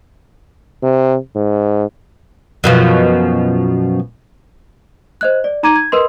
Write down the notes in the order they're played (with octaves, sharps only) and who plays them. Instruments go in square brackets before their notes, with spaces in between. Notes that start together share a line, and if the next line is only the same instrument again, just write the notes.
[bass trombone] C3
G#2
[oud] F#2 B2 F3
[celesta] C5 D#5 F#6
D5
D#4 A#5 D6 G#6 D#7
G#6
A#4 B4 D#5 C6